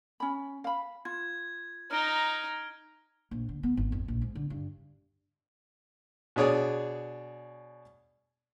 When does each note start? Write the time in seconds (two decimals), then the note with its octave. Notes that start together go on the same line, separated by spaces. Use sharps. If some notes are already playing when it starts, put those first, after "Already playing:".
0.20 C#4 B5
0.64 F5 B5
1.05 F4 G#6
1.91 D#4 A#5 F6 D7 G7
3.31 A#1
3.49 D3
3.63 B3
3.77 G#1
3.92 F2
4.08 A#1
4.22 G#2
4.35 D3
4.50 G2
6.36 B2 D4 G#4 C#5 D5 D#6